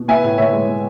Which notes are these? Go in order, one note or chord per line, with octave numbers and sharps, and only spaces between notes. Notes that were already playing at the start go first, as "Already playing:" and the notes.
Already playing: B2
B3 E5 G#5
A2
A2 C#5 E5
G#3
B3